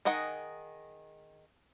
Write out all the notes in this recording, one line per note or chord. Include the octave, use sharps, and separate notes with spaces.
D#3 G#4 D#5 F#5